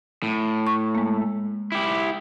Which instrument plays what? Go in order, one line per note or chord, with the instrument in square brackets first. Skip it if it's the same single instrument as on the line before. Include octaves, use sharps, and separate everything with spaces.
[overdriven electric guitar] A2
[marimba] C#6
G#3 A#3
[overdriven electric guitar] E4 G4